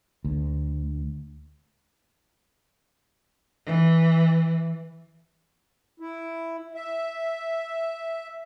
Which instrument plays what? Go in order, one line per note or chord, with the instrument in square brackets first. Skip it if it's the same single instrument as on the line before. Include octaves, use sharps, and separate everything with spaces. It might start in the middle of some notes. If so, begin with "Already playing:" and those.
[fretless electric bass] D2
[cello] E3
[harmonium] E4
E5